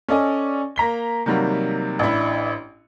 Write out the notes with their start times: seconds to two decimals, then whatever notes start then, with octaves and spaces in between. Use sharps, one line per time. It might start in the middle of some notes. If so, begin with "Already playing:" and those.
0.09 C#4 A4 D5 D#5 G#5
0.76 A#3 A#5 B6 G7
1.26 C3 D#3 F#3 G3 A#3
1.99 A1 D4 E4